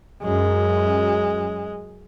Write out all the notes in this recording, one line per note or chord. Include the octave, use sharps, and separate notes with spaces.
F#2 G#3